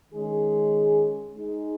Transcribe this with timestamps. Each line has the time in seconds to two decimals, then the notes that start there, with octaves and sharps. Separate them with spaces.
0.12 D#3 G#3 C#4 G#4
1.34 G#3 D#4 G#4